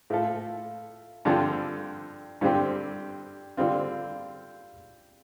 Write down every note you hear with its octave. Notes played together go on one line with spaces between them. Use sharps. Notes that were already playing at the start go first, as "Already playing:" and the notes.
A2 A3 F4 A4
G2 D3 F3 C4 A4
G2 D3 G3 C4 G4
D3 G3 C4 F4